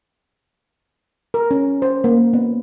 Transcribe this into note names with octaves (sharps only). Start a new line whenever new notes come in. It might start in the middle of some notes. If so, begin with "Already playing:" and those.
A#4
C#4
C5
A#3
B3